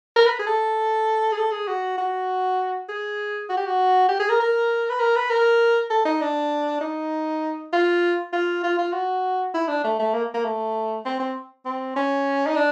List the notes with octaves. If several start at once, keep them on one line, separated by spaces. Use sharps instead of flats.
A#4
B4
G#4
A4
G#4
A4
G#4
F#4
F#4
G#4
F#4
G4
F#4
G4
G#4
A#4
A#4
B4
A#4
B4
A#4
A4
D#4
D4
D#4
F4
F4
F4
F4
F#4
E4
D4
A3
A3
A#3
A#3
A3
C4
C4
C4
C#4
D#4
D4